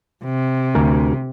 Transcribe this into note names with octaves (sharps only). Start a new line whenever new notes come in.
C3
D2 A#4 G#5